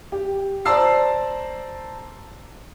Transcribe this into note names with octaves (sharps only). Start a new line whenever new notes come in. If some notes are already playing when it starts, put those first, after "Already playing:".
G4
C5 D5 A5 A#5 E6 C7